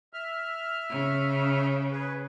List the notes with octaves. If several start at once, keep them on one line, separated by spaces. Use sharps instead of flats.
E5 F6
C#3
G#4 B4